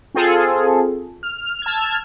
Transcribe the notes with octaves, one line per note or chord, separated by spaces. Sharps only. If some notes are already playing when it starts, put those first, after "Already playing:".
C4 F4 G#4 A4
F6
A5 E6 F6 G#6